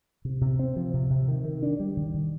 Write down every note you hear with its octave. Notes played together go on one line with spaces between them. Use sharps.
C3
C3
C4
F3
C3
C3
D#3
D#3
D4
G3
D#3
D#3